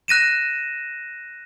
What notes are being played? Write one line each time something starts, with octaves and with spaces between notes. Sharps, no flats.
F#6 A#6 D#7 E7